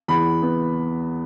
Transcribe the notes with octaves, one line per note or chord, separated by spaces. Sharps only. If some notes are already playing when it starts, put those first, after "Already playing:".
E2 B5
B3